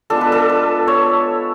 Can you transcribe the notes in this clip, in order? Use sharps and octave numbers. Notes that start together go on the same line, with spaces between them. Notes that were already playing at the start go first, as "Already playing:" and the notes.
G#3 B3 D4 F4 A4
B4
A4
B4
C#5